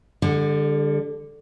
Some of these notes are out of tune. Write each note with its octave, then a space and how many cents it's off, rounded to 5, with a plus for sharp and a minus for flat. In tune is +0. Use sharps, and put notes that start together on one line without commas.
D3 +0 G3 +40